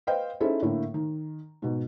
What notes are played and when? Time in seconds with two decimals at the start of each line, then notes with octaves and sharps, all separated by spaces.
0.07 B4 C5 D#5 F5 G5
0.40 C#4 D#4 E4 G#4 A4 C5
0.62 A2 D3 A#3 E4
0.94 D#3
1.62 G#2 B2